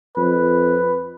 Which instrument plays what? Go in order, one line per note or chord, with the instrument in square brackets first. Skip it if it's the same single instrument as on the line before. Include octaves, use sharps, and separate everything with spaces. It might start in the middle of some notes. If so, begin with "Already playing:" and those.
[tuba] F2 [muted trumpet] B4